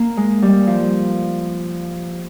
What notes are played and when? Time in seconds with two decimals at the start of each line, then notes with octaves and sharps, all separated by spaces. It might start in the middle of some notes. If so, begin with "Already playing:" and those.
Already playing: A#3
0.17 G#3
0.42 G3
0.67 F3